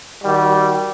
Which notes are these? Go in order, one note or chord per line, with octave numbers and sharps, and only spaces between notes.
D#3 G3 F#4